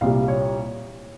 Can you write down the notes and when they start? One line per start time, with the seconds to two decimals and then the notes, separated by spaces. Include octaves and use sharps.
0.01 C2 A#2 G3 F5
0.28 C#5